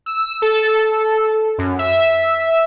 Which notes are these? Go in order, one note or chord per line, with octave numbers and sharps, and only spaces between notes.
E6
A4
F#2
E5